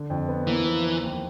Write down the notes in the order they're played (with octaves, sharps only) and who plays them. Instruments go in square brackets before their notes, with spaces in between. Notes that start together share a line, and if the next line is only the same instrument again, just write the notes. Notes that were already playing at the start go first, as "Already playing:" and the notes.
Already playing: [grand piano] D3
F2
B3
[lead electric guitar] E3 [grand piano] A#3
[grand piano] F3
F3
D#2